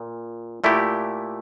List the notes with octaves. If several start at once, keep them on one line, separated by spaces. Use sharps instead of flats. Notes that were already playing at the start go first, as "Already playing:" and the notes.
Already playing: A#2
A#2 A3 E4 G4